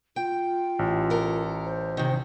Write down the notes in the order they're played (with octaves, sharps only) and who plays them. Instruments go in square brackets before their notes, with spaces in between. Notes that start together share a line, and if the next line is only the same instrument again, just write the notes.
[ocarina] F4 [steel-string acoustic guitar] G5
[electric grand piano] A1
[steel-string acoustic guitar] A4 A#4
[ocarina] C5
[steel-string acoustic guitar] C3 D#3